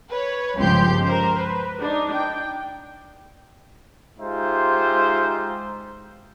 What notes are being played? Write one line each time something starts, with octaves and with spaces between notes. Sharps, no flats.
B4 C#5
G1 C#2 F3 G4 C6 G6
A#4 C5
B4
D4 D#4
G5
G#3 D#4 F4 G4 C5 E5